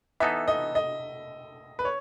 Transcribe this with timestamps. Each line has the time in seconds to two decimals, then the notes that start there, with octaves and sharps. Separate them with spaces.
0.20 E3 B3 D#4 A4 E5
0.48 D#5
0.75 D#5
1.79 B4
1.85 C#5